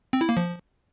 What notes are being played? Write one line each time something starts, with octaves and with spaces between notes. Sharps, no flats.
C4
E4
A#3
F3